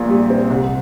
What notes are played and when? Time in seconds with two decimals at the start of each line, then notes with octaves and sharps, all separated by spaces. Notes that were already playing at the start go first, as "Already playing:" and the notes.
Already playing: A#1 A#2
0.09 G3
0.30 C4
0.50 C2